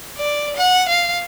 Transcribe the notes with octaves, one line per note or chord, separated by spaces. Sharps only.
D5
F#5
F5